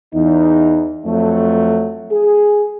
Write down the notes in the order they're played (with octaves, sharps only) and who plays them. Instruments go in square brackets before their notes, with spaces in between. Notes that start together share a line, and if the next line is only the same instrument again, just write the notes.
[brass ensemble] E2 D#4
F2 F#3 A3
G#4